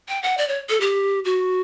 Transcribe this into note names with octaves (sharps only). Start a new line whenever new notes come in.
G5
F#5
D5
C#5
A4
G4
F#4